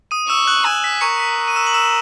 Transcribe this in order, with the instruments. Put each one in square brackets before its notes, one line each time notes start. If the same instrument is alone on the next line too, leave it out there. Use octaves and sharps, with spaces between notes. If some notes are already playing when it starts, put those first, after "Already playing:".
[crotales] D#6 D#7
[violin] C#6 [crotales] E6 E7
[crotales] F#6 F#7
[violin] G#5 [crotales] E6 E7
[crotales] B6
[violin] A#4 [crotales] C#6 C#7
[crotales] B6
D#7
E6 E7
F#7
E6 E7